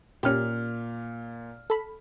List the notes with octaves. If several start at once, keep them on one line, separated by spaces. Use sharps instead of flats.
A#2 C#4 G4 F6
A4 B5